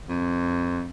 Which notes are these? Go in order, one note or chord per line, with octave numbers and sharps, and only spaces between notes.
F2